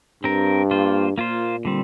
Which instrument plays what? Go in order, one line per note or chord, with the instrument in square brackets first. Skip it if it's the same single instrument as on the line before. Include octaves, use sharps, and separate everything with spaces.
[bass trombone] G2 [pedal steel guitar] C4 A#4
[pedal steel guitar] A#3 F4 C5
[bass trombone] A#2 [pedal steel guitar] A#3 F4 C5
[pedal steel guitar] D3 G3 C4